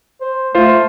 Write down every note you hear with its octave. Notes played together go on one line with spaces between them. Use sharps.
C5
A3 F4 C5